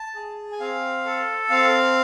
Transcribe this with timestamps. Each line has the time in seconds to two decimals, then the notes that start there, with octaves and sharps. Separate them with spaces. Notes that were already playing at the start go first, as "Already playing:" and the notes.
Already playing: A5
0.15 G#4
0.52 G#5
0.60 C4 F5
1.05 A4
1.50 C4 F5